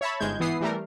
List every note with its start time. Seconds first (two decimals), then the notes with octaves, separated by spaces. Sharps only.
0.01 C#5 E5 A5 B5
0.20 G1 G#2 G#3 G6 G#6
0.40 E3 B3 D#6 C7
0.61 E3 G3 A3 A#4